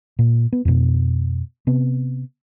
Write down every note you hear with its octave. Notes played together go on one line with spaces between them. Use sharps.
A#2
B3
F2 B2
C3 B3